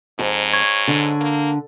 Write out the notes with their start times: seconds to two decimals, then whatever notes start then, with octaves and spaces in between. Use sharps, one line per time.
0.19 F2 G#2
0.53 C#5
0.88 D3
1.21 A#3